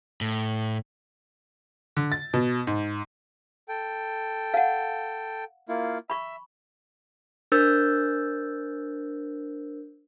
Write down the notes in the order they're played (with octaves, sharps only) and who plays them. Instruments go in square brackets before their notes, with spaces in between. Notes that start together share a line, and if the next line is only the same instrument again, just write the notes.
[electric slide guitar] A2
[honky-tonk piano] D3
A6
B2
G#2
[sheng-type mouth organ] A4 G5
[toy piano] F5 F#5
[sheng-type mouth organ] A#3 E4 F4
[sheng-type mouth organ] E5 [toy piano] B5 C#6
[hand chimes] D4 A#4 C5 E6 G6 A6